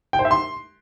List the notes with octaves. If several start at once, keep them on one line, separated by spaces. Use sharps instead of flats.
G5
C5
E5
C6